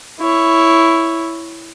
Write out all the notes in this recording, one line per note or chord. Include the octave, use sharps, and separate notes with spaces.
E4 C#5